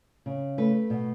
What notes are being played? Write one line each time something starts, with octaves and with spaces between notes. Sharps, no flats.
C#3
A3 B4
B2